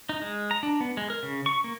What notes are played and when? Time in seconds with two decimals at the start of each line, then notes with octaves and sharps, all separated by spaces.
0.09 D#4
0.22 G#3
0.51 A#5
0.63 D4
0.81 B3
0.97 G#3
1.10 A#4
1.23 C#3
1.46 C#6
1.64 A#3